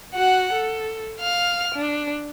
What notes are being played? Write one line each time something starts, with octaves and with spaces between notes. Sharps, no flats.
F#4 F#5
A4
F5 F6
D4